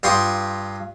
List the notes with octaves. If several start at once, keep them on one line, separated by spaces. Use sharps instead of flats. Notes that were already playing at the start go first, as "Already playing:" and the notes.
G2 F4 G5 C6 C#6 D#6